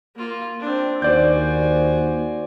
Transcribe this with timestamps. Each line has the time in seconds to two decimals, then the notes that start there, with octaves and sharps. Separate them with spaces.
0.16 A#3 F4
0.60 C4 D4
1.02 D#2 F#4 C5 D5 G#5 G6